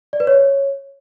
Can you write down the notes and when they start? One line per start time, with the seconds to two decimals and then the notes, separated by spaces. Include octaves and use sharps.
0.13 D5
0.20 B4
0.27 C#5